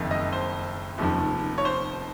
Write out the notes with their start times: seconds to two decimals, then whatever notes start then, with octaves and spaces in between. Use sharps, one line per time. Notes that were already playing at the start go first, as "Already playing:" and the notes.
Already playing: F#1 F2 D#3
0.11 D#5
0.33 C5
0.98 F1 D#2 C#3 F3
1.58 C#5
1.65 C5